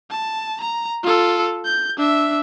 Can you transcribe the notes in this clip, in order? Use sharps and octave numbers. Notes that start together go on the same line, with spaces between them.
A5
A#5
F4 A4
G6
D4 E5